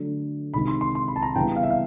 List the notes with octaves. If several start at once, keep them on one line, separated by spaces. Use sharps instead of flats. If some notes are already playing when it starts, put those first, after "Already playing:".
Already playing: D3 F#3 A3 D4
C3 D#3 G#3 C4 D#4 B5
C6
C6
C6
B5
A5
A#5
C#3 E3 G3 B3 G5
F5
E5
F5